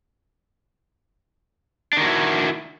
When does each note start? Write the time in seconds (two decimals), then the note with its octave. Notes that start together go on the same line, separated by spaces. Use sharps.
1.93 D4
1.97 D#3
2.02 F#4
2.06 E4